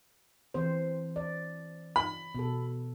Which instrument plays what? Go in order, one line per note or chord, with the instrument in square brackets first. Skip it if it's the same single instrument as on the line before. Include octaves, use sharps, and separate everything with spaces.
[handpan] E3 C4 C5
D5
[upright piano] B5
[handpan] B2 A4